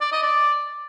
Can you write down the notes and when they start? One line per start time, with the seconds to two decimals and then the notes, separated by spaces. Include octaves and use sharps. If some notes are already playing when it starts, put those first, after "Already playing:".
0.01 D5
0.12 D#5
0.23 D5